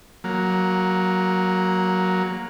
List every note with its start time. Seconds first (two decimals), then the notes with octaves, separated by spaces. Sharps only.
0.24 F#3 A#3